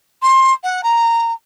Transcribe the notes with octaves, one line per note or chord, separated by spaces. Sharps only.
C6
F#5
A#5